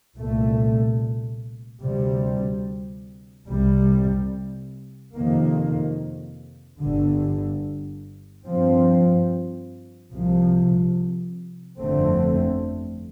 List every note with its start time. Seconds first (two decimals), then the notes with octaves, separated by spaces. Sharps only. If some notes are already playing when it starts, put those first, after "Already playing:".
0.16 C2 A#2 A3
1.82 D2 C3 G3
3.48 C2 C3 G3
5.14 F2 C3 D#3 A#3
6.80 G1 G2 D3
8.46 G2 F3 C4
10.13 C2 C3 F3
11.79 G1 F2 D3 A3 C4